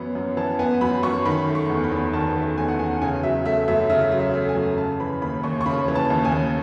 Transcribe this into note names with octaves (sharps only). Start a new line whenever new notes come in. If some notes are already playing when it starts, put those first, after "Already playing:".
Already playing: F#2 E3 B3 B5
F#2
E3 A5
B3 G#5
F#2 B5
F#2 C#6
D#3 B5
A3
C#6
E2
B5
E2
D#3 A5
A3
E2 G#5
F#5
E2 G#5
C#3 G#5
F#3 E5
A3 E5
F#2 E5
C#3 E5
F#3
E5
A3
G#5
F#2
C#3 A5
E3 B5
D#2 B5
D#2 C#6
C#6
C#3 B5
E3
A5
D#2
G#5
D#2